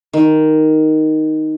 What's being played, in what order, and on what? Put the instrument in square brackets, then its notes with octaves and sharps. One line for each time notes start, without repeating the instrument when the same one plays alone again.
[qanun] D#3